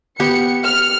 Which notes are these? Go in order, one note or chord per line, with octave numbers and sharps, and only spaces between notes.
B3 G4 C#7
F6